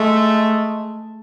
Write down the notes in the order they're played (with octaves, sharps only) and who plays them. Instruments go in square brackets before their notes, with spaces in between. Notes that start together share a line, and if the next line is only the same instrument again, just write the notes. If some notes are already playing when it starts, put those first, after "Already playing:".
Already playing: [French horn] G#3 [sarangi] A3